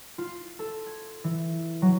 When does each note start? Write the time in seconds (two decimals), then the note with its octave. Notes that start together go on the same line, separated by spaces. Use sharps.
0.18 F4
0.59 A4
0.87 G#6
1.24 E3
1.82 F#3